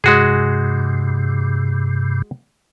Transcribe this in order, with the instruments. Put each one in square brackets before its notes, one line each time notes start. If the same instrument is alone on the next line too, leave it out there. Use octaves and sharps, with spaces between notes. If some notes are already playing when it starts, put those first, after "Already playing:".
[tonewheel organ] G2 C3 [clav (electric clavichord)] G#3 F#4 G#4